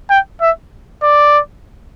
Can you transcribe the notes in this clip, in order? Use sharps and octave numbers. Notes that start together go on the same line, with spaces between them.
G5
E5
D5